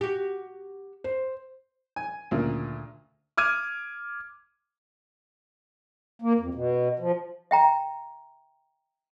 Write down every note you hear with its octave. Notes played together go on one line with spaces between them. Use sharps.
F#4 G4
C5
G#5
D2 A#2 C#3
D6 F6 G#6 D#7
A#3
F2
B2
F3
E5 G5 A#5